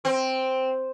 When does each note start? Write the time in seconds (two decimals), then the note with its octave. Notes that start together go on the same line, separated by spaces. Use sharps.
0.05 C4